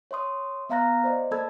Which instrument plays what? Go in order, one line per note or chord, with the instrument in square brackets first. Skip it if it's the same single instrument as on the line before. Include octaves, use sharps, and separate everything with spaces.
[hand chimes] C#5 E5 C6 D#6
B3 E5 F5 A#5 F#6 A#6
C5 D5 D#5
A#3 A4 A5 B5 E6 G#6